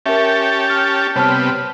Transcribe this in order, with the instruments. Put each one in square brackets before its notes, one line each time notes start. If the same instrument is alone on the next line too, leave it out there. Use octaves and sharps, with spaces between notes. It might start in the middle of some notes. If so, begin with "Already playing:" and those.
[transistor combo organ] C#4 G4 A5 [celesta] A#4 E5
[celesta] F6
[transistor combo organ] C3 G3 B3 [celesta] C#5 A5 F6